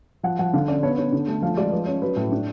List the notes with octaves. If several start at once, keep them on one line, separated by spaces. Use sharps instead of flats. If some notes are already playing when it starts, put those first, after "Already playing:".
F3 F#5
F3 F#5
D3 F5
C#4 D5
B3 C#5
D4 C#5
D3
A3
F3 F5
G#3 D5
F3 B4
C#4 C#5
F#3 B4
A2
D4